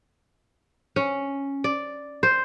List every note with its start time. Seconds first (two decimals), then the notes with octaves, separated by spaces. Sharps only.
0.96 C#4
1.64 D5
2.23 C5